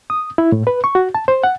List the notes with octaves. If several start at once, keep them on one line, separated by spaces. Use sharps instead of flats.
D#6
E4
A2
B4
C#6
F#4
A5
C5
F#5